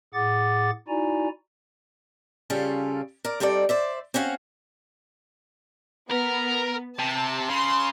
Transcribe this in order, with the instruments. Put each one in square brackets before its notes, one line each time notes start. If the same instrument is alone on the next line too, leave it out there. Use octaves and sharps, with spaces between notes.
[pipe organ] A2 G#4 F#5 D6 A6
D#4 E4 F#4 D5 G#5 A#5
[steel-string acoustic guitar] C#3 G3 C#4 F4 A4
A#4 D5
G3 C4 D#4 A4 D5
C5 D5 E5
C4 C#4 F#4 C#5 F5
[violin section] B3 [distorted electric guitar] A#4
[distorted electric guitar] C3 [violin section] A5
[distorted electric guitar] C#3 [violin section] C6